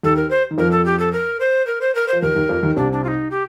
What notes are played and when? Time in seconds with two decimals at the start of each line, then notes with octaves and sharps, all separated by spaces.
0.03 D#2 D#3 A4
0.16 A#4
0.30 C5
0.51 D#3
0.58 F2 F3 A#4
0.71 A4
0.86 G4
0.99 A4
1.13 A#4
1.40 C5
1.67 A#4
1.81 C5
1.95 A#4
2.08 F3 C5
2.22 D#2 D#3 A#4
2.35 D#2 D#3
2.49 F2 F3
2.63 D#2 D#3
2.76 C2 C3 D4
2.92 D4
3.04 F4
3.08 D#4
3.31 G4